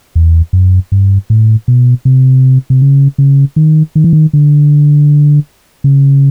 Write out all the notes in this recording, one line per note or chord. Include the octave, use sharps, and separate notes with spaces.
E2
F#2
G2
A2
B2
C3
C3
C#3
C#3
D#3
D#3
E3
D#3
D3
C#3